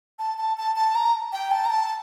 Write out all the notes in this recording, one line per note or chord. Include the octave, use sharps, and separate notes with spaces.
A5
A5
A5
A5
A#5
G5
A5
A#5
A5